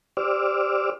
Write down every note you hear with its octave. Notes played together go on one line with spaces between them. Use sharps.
G4 C5 D5 D6 E6 F6